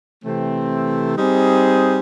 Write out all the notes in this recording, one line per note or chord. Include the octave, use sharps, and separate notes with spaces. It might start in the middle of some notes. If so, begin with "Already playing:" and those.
C3 E3 A3 C4
G3 C4 D#4 G#4 C5